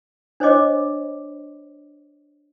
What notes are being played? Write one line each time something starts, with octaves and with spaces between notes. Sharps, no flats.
D4 C5 C#5 D#5 D6